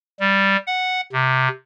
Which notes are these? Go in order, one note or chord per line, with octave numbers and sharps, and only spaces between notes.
G3
F#5
C3